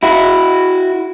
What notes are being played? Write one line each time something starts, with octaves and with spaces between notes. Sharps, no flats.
E4 F#4